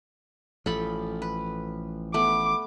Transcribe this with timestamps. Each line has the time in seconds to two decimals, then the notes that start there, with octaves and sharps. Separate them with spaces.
0.66 A1 F3 A4 B5
1.22 B4
2.14 A3 B3 D6